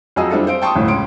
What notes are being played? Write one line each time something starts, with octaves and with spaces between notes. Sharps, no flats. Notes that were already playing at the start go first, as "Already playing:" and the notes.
F2 F#3 F4 G#4 D#5 E6
G3 C4 D4 E4 F4 A4
C5 F5 D7
G5 A5 C6 C#6 D#6
G1 E2 A2
C#2 C#4 C6 D7